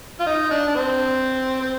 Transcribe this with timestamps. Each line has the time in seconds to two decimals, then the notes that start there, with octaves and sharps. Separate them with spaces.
0.20 F4
0.26 D#4
0.51 D4
0.68 D4
0.75 C4
1.61 C4